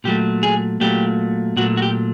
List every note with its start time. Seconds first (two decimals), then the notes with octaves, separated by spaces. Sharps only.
0.04 A#2 F#3 A3 G4
0.43 G#4
0.80 A#2 F#3 A3 G4
1.57 A#2 F#3 A3 F#4
1.77 F#4
1.82 G4